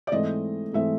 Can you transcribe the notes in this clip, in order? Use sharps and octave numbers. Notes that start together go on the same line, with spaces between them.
D5
G#2 E3 A3 C4 D#5
G#2 E3 A3 C4 E5